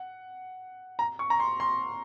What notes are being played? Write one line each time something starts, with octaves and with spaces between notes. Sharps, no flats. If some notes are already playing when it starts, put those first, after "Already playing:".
Already playing: F#5
A#5
C#6
A#5
C6
C6